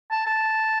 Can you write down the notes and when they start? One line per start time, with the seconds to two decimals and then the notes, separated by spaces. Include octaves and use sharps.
0.11 A5
0.26 A5